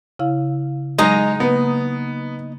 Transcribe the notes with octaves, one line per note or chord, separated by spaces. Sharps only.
C#3 E4 F5
F#3 G#3 D#4 D#5 A#5
C#3 A#3 B3